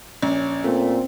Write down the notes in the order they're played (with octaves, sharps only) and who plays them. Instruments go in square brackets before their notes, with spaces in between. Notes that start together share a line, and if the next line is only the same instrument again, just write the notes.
[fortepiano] A#1 [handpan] C#4
[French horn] A#2 [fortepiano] A3 [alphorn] C4